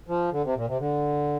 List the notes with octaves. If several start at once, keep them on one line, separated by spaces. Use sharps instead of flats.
F3
D3
C3
A#2
C3
D3